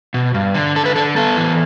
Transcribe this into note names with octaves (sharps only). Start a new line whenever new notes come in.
B2
G2
D3
D3 A4
B4
D3 A4
B3 A4
E3